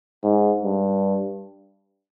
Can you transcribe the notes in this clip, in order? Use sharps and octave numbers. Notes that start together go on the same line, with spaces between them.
G#2
G2